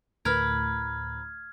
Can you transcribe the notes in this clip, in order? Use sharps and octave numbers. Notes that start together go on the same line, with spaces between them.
D2 A2 A#4 B4 F6 G#6